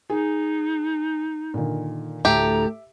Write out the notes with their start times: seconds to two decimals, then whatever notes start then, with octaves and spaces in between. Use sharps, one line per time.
0.10 D#4 G#4
1.54 A#2 D3 D#3
2.25 D2 A2 A3 G4 E5 A#5